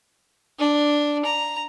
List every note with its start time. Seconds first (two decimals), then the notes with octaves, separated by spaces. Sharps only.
0.59 D4
1.25 A#5